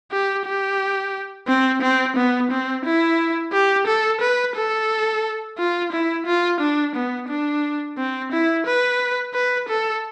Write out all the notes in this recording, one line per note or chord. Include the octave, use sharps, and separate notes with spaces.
G4
G4
C4
C4
B3
C4
E4
G4
A4
B4
A4
F4
E4
F4
D4
B3
D4
C4
E4
B4
B4
A4